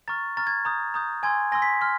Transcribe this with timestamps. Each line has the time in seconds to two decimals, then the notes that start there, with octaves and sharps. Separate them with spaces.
0.08 A#5 C#6 F6 A6
0.37 A#5 C#6 F6 A6
0.47 G#6
0.65 A#5 D#6 G6
0.94 A#5 D#6 G6
1.23 G#5 C6 E6 G#6
1.52 G#5 C6 E6 A#6
1.62 B6
1.81 C6 F6